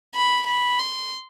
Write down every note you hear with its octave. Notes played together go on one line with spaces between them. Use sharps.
B5
B5
C6